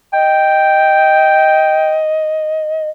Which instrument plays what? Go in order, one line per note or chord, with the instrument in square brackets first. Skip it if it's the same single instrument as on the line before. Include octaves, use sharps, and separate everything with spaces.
[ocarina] D#5 [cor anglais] G5